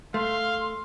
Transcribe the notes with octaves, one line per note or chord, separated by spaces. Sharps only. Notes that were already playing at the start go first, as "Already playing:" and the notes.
A3 F5 C6